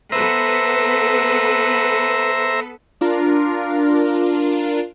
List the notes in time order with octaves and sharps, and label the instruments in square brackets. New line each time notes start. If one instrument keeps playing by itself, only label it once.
[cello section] B3 A4 B4 [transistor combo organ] C5 E5 A#5
[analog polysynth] D4 F4 A#4